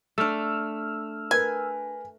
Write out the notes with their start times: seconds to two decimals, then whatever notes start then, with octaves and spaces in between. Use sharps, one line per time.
0.18 A3 D4 E6 F6
1.31 A#4 B4 G#5